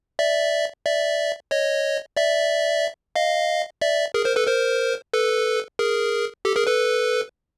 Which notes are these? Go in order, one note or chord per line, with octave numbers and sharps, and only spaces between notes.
D5 E5
D5 E5
C#5 D#5
D5 E5
D#5 F5
D5 E5
G#4 A#4
A#4 C5
A4 B4
A#4 C5
A4 B4
G#4 A#4
G4 A4
G#4 A#4
A4 B4